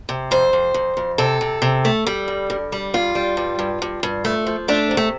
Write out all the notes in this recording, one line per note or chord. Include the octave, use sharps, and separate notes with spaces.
C3
F2 C5
F2
F2
F2
C3 A4
C3
C3
A3
G3
G2
G2
G3
G2 F4
G3
G2
G2
G2
G2
A3
F3
A3 D4
C3
A3